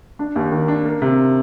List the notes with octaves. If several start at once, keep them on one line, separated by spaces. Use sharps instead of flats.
D4
D#2
D#3
D4
A#3
C3